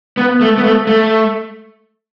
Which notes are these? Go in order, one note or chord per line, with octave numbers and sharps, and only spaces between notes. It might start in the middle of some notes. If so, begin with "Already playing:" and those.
B3
A3
B3
A3
A3